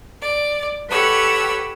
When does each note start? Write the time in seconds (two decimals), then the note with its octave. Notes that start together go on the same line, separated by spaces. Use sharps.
0.20 D5
0.90 G4 A4 B4 C#5 F#5 E6